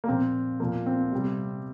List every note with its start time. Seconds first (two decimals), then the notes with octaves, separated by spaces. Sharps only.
0.04 A#3
0.08 A#2 F3 C4
0.60 A#2 F3 A#3
0.86 C4
1.12 C3 G3